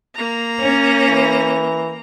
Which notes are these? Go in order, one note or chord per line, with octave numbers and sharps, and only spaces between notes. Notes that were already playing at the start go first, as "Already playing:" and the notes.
A#3 A#5
C#4
E3